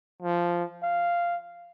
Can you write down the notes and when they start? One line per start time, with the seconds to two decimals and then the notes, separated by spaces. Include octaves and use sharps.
0.22 F3
0.83 F5